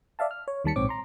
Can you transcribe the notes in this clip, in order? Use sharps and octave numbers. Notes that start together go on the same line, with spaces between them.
D5 E5 F5 A5
F6
C#5
D#2 D#3 G3 A5 B6 C#7
A#1 G#2 C4 C#5 D6
A#5 C6